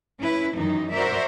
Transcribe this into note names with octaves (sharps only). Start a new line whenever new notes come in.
C#4 E4 B4
F#2 D#3 E3 F#3 D#4
F#4 A#4 C5 D5 E5